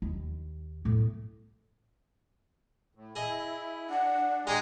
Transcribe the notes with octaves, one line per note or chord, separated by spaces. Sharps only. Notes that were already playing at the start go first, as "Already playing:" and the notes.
D#2
A2 B3
A2
E4 G#4 D#5
D4 F#5
G#3 G4 G#4 D#5 A#5